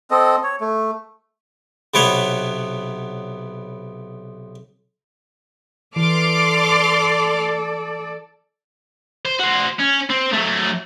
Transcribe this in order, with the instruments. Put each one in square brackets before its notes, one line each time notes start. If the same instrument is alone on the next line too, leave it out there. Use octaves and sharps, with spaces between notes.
[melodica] C4 A4 D#5
C#5
A3
[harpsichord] B1 C3 B3 B4 C#5
[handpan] E3 [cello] A4 D5 [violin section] C6 D6 F6
[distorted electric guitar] C5
F#4 C5
C#4
C4
F#3 A3